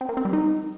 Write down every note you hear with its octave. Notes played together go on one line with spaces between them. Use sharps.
C4
A#3
C4
G3
D#4